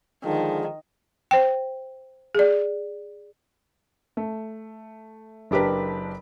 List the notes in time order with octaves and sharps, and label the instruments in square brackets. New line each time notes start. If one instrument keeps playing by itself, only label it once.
[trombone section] D3 F3 G#3 [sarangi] D#3
[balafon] C5 G5
G#4 D5
[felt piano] A3
F#1 D4 G4 A#4 B4